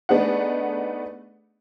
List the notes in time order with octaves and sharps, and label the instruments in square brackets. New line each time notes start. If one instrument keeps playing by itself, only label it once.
[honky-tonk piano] A3 B3 D4 D#4 G#4 F#5